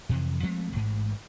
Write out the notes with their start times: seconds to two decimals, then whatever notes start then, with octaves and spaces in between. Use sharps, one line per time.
0.09 F2 C3 E3
0.43 F3 G#3 A3 C4
0.72 A1 G#2